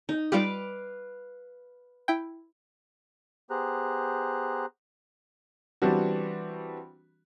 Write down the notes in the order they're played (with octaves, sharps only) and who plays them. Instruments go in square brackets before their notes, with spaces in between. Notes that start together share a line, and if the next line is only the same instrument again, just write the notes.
[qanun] D#4
[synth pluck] G3 F4 G4 [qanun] B4 F5 D6
[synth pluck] E4 G5
[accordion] B3 G4 G#4 C5 A#5 F#6
[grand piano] E3 G3 B3 C4 D4 F#4